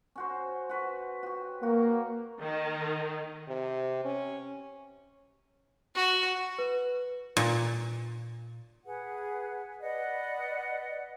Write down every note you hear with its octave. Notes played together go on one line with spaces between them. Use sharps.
C#4 F#4 C5
F#4 B4
F#4 G4
A#3 F#4
D#3
C3
C#4
F#4
B4
A#2
G#4 B4 F#5
B4 D5 D#5 F#5